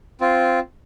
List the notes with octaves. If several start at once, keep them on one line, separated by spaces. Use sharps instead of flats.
C4 F4